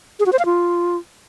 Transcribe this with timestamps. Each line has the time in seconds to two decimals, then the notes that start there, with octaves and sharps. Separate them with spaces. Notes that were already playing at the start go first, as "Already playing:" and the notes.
0.20 G#4
0.26 F#4
0.33 C5
0.39 F5
0.45 F4